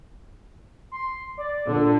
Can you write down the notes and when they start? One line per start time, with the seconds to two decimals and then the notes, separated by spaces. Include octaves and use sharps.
0.92 C6
1.38 D5
1.68 A#2 D3